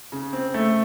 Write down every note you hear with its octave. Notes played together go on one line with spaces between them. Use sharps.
C#3
C4
A3